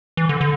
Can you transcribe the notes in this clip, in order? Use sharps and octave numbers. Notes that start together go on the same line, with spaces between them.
E3
D3
D3